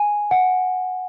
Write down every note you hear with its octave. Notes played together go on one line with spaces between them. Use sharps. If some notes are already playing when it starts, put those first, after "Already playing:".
Already playing: G#5
F#5